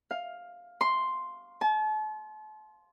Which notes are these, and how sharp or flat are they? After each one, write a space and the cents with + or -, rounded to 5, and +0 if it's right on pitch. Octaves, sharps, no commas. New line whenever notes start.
F5 +10
C6 +0
A5 -40